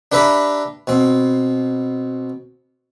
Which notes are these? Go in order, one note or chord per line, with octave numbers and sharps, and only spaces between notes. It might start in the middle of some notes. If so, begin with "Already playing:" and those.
D4 G4 B4 E5 A#5 B5
B2 C4